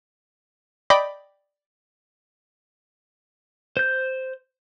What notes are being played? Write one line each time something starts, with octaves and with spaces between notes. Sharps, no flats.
D5 D#5 G5 B5 D6
C5 G6